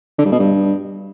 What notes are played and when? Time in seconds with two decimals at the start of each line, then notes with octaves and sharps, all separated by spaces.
0.18 D3
0.25 G2
0.32 B2
0.39 G2